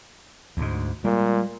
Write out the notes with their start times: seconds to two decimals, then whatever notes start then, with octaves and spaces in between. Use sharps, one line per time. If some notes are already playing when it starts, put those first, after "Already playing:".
0.57 D2 G#2
1.05 A#2 G3 G#3